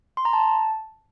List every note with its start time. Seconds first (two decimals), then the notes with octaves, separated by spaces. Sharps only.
0.17 C6
0.25 A#5
0.33 A5